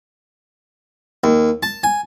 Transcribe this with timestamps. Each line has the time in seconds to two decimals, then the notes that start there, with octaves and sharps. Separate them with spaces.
1.24 D#2
1.63 A5
1.83 G#5